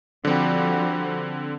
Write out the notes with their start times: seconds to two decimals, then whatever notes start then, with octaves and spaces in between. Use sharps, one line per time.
0.25 D3 F3 G3 C4 F#4